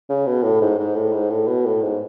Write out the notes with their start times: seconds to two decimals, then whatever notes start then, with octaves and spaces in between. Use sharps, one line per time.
0.09 C#3
0.27 B2
0.43 A2
0.61 G#2
0.79 G#2
0.96 A2
1.13 G#2
1.30 A2
1.48 B2
1.66 A2
1.82 G#2